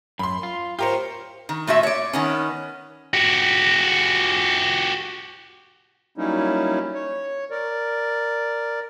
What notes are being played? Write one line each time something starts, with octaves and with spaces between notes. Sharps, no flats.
F#2 B5 C6
F4
F4 G4 A#4 C5 C#5
D#3
A#2 A3 F#4 E5
C#5 D5
D#3 B3 C#4
F#4 G4
F#3 G3 A#3 C#4 D#4 E4
C#5
A#4 D5